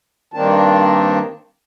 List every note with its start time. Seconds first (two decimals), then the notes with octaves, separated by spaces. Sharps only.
0.34 G2 D#3 A#3 C4 D4 A5